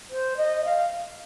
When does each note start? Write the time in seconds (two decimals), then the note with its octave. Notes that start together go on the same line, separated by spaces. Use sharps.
0.10 C5
0.36 D#5
0.64 F5